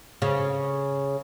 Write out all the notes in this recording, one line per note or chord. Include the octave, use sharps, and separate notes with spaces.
C#3